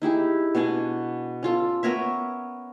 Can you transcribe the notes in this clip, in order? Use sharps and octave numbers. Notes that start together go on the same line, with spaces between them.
D#4 E4 G4 G#4
B2 D4 F#4 G#5
C#4 F4 A4
B3 A#4 C#5 E5